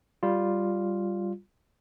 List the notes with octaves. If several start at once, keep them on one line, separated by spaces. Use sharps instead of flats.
G3 F4